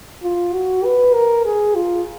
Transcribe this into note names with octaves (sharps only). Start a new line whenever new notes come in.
F4
F#4
B4
A#4
G#4
F4